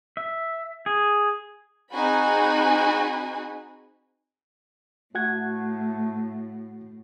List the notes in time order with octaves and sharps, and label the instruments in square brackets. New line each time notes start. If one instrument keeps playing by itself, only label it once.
[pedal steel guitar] E5
G#4
[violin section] C4 D#4 F#4 G#4 G#5 B5
[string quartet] A2 [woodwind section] A3 [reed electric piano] F#4 F#5 G#6